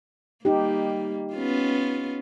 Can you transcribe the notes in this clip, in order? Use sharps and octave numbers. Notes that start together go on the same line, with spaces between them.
G3 A#3 D#4 G4
B3 C#4 F4